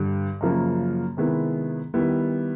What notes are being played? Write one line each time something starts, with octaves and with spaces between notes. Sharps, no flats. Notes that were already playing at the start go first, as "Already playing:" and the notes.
Already playing: G2 D3 G3
F#2 C#3 F3 A#3
C3 D#3 G#3 B3 E4
D#3 G3 B3 E4